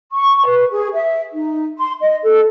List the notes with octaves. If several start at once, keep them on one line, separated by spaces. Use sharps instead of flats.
C#6
B4
G#4
E5
D#4
C6
D#5
A4